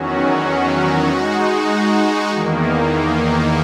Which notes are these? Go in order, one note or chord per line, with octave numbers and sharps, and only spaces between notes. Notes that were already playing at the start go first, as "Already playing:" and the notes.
Already playing: E2 D#3 F#3 C#4 F#4
G#3 D#4 F#4
E2 D#3 A#3